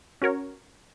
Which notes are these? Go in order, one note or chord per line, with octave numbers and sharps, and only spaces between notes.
C#4 F#4 A#4 C#5